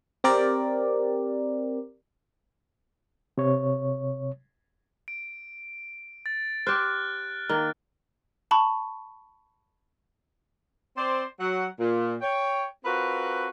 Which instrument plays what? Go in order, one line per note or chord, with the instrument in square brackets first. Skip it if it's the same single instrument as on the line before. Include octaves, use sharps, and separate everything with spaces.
[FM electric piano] C4 G4 A#4 D5
[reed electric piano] C3 C#5
[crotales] D7
A6
[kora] G4 C5 [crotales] F6 F#6
[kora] D#3 A#3 [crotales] F6
[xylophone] A5 B5 C#6
[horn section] C4 C5 D5
F#3 F#5
A#2
C#5 G5
C4 F4 F#4 A#4 B4